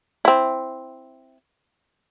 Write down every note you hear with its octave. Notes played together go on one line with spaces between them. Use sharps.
C4 E4